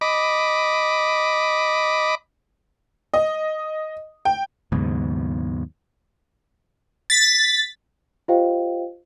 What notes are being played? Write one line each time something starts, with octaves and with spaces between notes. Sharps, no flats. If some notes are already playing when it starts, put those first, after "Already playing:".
D#5 B5 D6
D#5
G5
D#2 G#2 C#3 F#3 B3
A6 B6
F4 G4 C5 D#5 F5 G5